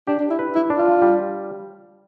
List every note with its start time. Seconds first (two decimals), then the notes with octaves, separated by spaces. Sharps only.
0.07 D4 G4
0.19 D4
0.30 E4
0.39 B4
0.55 E4
0.70 D4
0.78 F4
1.02 G3